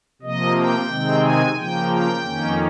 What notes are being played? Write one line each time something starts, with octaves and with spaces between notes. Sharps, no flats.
C3 F3 A#3 D#5
G5
C3 D#3 G#3 C4
G#5
C#3 F3 A#3 G5
G5
F2 D#3 A#3 C#4